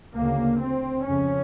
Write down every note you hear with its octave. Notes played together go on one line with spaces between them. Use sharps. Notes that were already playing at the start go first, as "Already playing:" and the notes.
D2 C#3 A#3
C4
F2 C#3 C#4